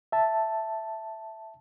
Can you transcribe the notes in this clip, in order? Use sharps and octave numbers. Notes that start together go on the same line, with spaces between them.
E5 A5